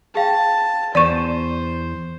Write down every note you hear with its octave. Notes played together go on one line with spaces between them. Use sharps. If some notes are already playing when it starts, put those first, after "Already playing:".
G#4 F5 G5 A5
E2 C5 D5 C#6 A6 D#7 E7